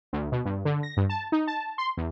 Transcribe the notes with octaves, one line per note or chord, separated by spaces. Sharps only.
D2
B2
G2
D3
A#6
G2
A5
D#4
A5
C6
E2